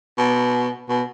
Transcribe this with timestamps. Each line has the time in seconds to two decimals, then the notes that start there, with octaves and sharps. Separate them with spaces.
0.18 B2
0.89 B2